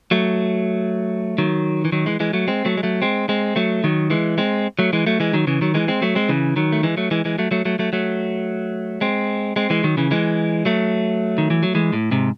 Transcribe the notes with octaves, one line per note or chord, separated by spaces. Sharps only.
F#3 A3
D#3 F#3
E3
D#3 F#3
E3 G#3
E3 G#3
F#3 A3
G#3 C4
F#3 A3
G#3
F#3 A3
G#3 C4
G#3 C4
F#3 A3
D#3 F#3
E3 G#3
G#3 C4
F#3 A3
E3 G#3
F#3 A3
E3 G#3
D#3 F#3
C#3 E3
D#3 F#3
E3 G#3
G#3 C4
F#3 A3
G#3 C4
C#3 E3
D#3 F#3
A3
E3 G#3
F#3 A3
E3 G#3
E3 G#3
F#3 A3
F#3 A3
F#3 A3
F#3 A3
F#3 A3
G#3 C4
G#3 C4
E3 G#3
D#3 F#3
C#3 E3
E3 G#3
F#3 A3
D#3
E3
F#3
E3 G#3
A2
G#2 C3